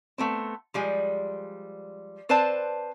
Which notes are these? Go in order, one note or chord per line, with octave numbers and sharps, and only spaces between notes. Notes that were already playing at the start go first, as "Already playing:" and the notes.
A3 B3 C4
F3 G3 G#3
C4 B4 C5 D5 A5